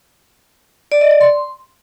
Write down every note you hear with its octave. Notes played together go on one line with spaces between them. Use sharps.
D5
D#5
D5
C6